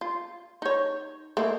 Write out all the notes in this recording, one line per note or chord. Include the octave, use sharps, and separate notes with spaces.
F4
D#4 C#5
A3 A#3 D#5